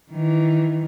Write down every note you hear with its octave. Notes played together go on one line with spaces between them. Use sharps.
D#3 E3